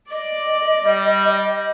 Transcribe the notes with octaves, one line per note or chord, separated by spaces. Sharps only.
D5 D#5 D6
G3